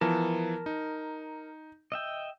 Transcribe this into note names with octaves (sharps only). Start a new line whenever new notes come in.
E3 F3 B3 A#4 A5
D#4
D#5 E5 G5